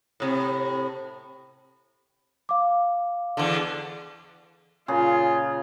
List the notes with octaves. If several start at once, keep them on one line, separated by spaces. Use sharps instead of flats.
A2 C3
F5 D6
E2 D3
A#2 C#3 F4 G#4